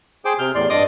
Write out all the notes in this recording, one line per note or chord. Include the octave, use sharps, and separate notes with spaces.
G#4 C5 G5 D6
C3 F6 G6
E2 A2 D5 C6
G2 D5 D#5 C6 D6 D#6